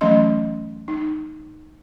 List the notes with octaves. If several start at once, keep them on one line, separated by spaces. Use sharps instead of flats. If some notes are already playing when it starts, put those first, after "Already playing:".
E3 F#3 A3 C#4 D#5 C6
D#4